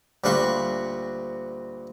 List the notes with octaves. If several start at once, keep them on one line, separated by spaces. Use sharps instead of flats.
D2 A#2 G3 F#4 C6 C#6